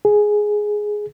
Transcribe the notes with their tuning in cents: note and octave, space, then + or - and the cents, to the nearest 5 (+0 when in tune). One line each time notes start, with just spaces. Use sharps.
G#4 +5